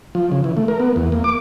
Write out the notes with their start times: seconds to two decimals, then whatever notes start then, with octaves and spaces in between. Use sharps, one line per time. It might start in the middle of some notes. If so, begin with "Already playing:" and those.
0.15 F3
0.32 C#3
0.44 E3
0.57 A3
0.68 A#4
0.80 B3
0.96 E2
1.12 A#3
1.24 D6